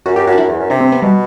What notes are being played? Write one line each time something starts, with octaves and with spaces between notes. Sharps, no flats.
F#2 F#4
F#2 G4
F#2 F#4
D4
F#2 E4
E2
F#2
C3 D4
C4
B3
B2 G3